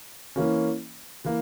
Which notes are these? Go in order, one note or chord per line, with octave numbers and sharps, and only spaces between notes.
E3 A#3 C#4
E3 A#3